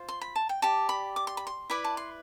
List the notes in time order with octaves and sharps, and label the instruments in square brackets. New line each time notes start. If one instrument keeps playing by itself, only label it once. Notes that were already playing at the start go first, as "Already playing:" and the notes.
Already playing: [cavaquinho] F4 C5
C6
B5
A5
G5
G4 D5 A5
B5
D6
C6
B5
C6
E4 B4 D5 B5
A5
C6